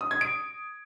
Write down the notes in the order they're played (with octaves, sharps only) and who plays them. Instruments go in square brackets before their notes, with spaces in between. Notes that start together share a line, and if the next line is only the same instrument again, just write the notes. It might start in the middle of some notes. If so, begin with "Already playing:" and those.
[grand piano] D#6
G#6
D7